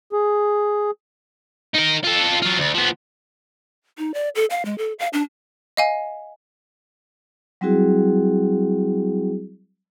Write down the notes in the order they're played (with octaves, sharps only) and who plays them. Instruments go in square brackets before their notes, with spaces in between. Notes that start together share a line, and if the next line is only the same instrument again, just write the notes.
[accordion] G#4
[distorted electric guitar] D#4 A#4
F4 A4
F#3 F4
D2
F3 B3
[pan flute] D#4
D5
A4
F5
G#3
A4
F5
D4
[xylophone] D#5 F5 G#5
[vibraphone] F#3 G3 C4 E4 F#4 G#4